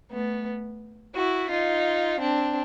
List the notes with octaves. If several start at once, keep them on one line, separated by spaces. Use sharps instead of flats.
A3 B3
E4 F#4
D#4 F4
C4 D4